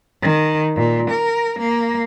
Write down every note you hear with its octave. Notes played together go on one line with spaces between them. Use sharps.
D#3
A#2
A#4
A#3